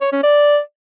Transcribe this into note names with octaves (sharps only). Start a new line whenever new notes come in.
C#5
C#4
D5